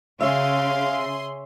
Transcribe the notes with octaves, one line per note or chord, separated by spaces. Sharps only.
C#3 G#4 C#5 E5 F5 C6